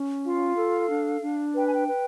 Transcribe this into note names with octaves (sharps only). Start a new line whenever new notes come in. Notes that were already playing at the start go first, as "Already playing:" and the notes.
Already playing: C#4
F4 F5
A4
D4
D4
B4 G5
G#5
G5
B4